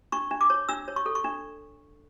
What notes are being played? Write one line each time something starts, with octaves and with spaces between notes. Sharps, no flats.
D4 C#6
D4
D6
C#5
D4 E6
C#5
C#6
A4
C#6
D4